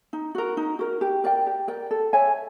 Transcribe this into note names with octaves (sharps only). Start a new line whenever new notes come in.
D#4
F#4 A#4
D#4
F#4 A#4
G4
A#4 D5 G5
G4
A#4 D5 G5
A4
C#5 E5 G#5